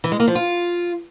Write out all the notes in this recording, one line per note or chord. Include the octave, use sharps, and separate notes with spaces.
E3
G#3
A#3
F3
F4